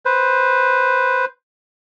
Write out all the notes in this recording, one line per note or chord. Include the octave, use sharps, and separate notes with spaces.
B4 C5